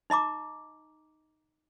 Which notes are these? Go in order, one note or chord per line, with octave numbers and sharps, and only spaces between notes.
D#4 D#5 A#5 D6